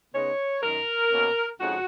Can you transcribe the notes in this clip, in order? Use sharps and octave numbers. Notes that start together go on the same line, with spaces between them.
C#3 G#3 B3 D#4 C#5
F#2 D#3 F#3 A#4
B2 A#3 C#4
F2 C#3 G#3 D#4 F#4